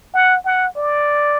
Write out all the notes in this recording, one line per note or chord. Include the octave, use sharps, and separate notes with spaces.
F#5
F#5
D5